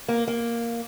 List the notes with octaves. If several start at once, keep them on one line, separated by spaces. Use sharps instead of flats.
A#3
A#3